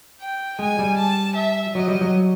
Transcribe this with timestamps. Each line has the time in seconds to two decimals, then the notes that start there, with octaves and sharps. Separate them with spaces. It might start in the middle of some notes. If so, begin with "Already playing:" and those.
0.20 G5
0.59 G#3 G#5
0.79 G3
0.97 A5
1.36 E5
1.75 F#3 D#5
1.88 G3
2.01 F#3